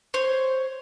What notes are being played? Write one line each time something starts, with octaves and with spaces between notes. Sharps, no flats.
C5 C#5